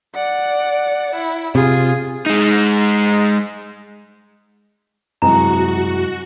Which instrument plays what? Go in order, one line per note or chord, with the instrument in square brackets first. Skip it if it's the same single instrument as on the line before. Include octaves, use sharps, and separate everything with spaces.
[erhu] D5 [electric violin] F#5
[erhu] E4
[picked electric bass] C3 [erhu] F4 [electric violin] G#4
[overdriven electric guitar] G#3 D#4
[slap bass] F#2 G3 [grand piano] C3 E3 G#3 [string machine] F#4 [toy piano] A#5